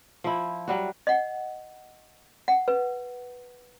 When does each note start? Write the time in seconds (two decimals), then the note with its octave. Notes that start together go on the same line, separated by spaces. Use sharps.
0.24 F3 E4
0.68 F#3 G3 F#4
1.07 D#5 F#5
2.48 F#5
2.68 B4